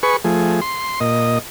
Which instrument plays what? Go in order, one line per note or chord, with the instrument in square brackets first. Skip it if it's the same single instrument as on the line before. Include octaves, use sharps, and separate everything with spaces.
[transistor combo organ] G#4 B4 C#6
F3 A3 G#4
C6
A#2 D#5